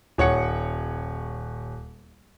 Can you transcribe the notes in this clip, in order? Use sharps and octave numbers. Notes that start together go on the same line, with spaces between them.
D#1 C#5 F#5 C#7